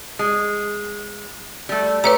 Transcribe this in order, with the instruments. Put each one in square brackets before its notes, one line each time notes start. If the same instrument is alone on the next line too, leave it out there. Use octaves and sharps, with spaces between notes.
[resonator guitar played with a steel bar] G#3
G3 A3
[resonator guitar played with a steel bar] A3 G4 [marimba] B4 C#5 A#5